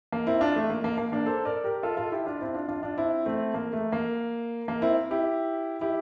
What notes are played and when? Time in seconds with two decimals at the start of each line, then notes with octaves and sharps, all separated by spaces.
0.12 A#3
0.27 C4 E4
0.41 D4 F4
0.56 A3
0.70 A#3
0.84 A#3
0.98 A#3
1.12 A#3 D4
1.26 A4 C5
1.45 A#4 D5
1.64 G4 A#4
1.83 F4 A4
1.97 F4 A4
2.12 E4 G4
2.26 D4 F4
2.41 C4 E4
2.54 D4 F4
2.68 D4 F4
2.83 D4 F4
2.97 C4 E4
3.25 A3 C4
3.54 A#3
3.73 A3
3.92 A#3
4.68 A#3
4.82 C4 E4
5.11 E4 G4
5.81 E4 G4